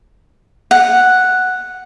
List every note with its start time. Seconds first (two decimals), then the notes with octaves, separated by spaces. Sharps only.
0.71 F#5